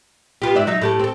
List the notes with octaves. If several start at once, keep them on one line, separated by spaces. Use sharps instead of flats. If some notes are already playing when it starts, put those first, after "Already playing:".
B3 F4 G4
G#2 D5 E5
F#3 D#4 E5
A2 G4 A4
C4 A4